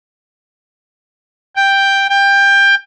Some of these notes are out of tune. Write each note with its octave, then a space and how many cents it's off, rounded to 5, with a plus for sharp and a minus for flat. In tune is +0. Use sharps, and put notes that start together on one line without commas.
G5 +5
G5 +20